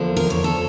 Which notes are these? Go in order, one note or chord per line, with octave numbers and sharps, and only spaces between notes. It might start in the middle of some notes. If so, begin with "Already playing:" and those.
Already playing: E2 D3 F3 A#3 D4
A#4
C#5
A4